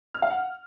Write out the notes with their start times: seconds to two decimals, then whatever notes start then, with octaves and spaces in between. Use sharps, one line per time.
0.14 F6
0.22 F5
0.30 F#5